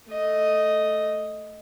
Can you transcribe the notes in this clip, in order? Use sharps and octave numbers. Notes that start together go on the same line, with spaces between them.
A3 D#5